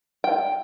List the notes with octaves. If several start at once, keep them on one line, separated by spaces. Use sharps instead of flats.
G5